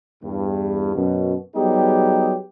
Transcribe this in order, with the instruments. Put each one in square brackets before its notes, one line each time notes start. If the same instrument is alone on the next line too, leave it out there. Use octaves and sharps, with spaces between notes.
[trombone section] E2 G2
F#2 B2
F#3 G3 B3 D#4 G4 G#4